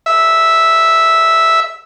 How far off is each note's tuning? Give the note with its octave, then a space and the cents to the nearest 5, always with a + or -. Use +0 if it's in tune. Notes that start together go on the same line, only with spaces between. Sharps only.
E5 -5